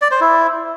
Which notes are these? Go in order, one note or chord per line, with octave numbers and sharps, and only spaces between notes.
D5
C5
E4